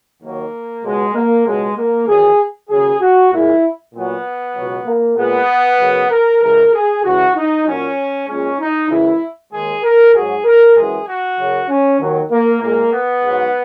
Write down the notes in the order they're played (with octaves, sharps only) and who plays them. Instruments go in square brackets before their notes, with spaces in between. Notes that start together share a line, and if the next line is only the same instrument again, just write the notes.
[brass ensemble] D#2 D#3 F#3 A#3
C#2 B2 F#3 G#3
A#3
C#2 B2 F#3 G#3
A#3
E2 D#3 F#3 G#4
D#2 C#3 F#3 G#4
F#4
A#2 G#3 E4
A#2 F#3 B3
C#2 B2 F#3
A#3
A#2 G#3 B3
F#2 C#3 F#3
A#4
F#2 C#3 E3 G#3 A#4
G#4
E2 C#3 E3 G#3 F#4
D#4
A#2 F#3 C#4
A#2 G#3 C#4
D#4
F#2 C#3 E3 G#3 E4
D#2 D#3 G#3 G#4
A#4
G#2 F#3 G#4
A#4
F#2 E3 G#3 G#4
F#4
F#2 C#3 F#3
C#4
D#2 D#3 F#3
A#3
A#2 G#3 A#3
B3
G#2 F#3